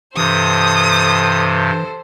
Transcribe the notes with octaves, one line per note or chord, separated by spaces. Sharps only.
G2 C3 E3 A4 C5 D#6